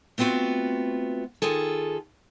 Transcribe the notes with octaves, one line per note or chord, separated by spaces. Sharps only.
A3 B3 C4 F4 F#4
D#3 F4 G#4 A4